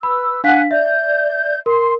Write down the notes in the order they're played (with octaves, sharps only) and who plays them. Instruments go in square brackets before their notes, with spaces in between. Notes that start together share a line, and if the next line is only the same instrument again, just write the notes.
[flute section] B4 E6 [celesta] B5
[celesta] D4 F5 B6 [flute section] F#5 G#5 F#6
[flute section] D5 G6 [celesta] E5
[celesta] A#4 [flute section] C6